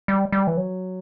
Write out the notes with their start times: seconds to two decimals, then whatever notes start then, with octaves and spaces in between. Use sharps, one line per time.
0.08 G3
0.32 G3
0.47 E3
0.57 F#3